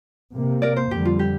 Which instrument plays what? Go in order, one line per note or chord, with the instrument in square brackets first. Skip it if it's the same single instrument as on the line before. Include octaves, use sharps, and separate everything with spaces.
[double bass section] C3 A#3
[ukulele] A#4 D5
C5
[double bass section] F2 D3 G3 [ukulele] G4
[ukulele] F4
G4